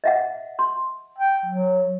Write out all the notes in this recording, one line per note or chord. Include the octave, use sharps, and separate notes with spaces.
D#5 E5 F#5
C6
G5
F#3